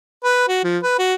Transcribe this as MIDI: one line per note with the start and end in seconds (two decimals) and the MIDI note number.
0.24 0.48 71
0.48 0.61 66
0.64 0.78 53
0.83 0.98 71
0.98 1.14 66